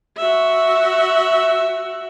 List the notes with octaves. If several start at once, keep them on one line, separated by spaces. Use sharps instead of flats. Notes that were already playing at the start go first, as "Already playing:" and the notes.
F#4 E5